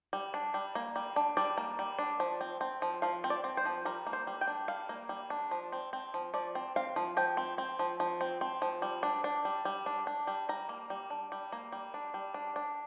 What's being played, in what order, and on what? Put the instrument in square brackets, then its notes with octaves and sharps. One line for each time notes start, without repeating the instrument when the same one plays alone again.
[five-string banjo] G3
D4
G3
A#3
G3
D4
G3 D5
A#3
G3
D4
F3
C4
C4
F3
F3 F5
C4
D5
C4
C5
F3
G3 A#4
A#3
C5
G3
G5
D4
G3 F5
A#3
G3
D4
F3
C4
C4
F3
F3 D5
C4
C4 F5
F3
F3 G5
C4
C4
F3
F3
C4
C4
F3
G3
D4
D4
G3
G3
D4
D4
G3
G3 A#5
A#3
G3
D4
G3
A#3
G3
D4
G3
D4
D4